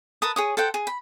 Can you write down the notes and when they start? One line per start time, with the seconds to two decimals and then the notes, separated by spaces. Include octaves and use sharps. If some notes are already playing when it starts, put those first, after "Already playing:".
0.22 A#4 B4 A5 D#6
0.36 G#4 C#5 D#6
0.57 A4 C5 F#5 G5
0.74 G#4
0.87 B5